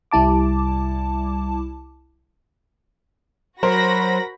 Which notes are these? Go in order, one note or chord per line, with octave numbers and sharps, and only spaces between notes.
C2 G3 E4 A5 D6
F#3 F#4 A#4 C5 B5 A#6